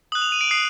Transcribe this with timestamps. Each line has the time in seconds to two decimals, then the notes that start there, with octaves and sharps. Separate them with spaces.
0.12 D#6 F#6 F#7
0.22 F7
0.32 D#7
0.41 D7
0.51 D#6 C7